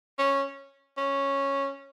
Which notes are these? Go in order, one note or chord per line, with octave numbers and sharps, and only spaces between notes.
C#4
C#4